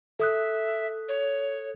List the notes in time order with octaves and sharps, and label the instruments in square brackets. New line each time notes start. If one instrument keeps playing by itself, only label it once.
[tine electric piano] A4 D#6 F#6 [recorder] E5
[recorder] C#5